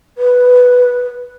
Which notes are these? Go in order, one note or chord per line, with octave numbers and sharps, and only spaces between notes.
B4